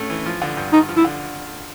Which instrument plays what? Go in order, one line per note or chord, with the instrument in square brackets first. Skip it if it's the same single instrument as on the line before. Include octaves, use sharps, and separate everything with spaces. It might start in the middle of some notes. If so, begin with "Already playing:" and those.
Already playing: [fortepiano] A2 A3 C#4
E3
F3
D3
G2
[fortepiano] G2 [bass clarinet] D#4
[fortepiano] F3
[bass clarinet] E4
[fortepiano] D3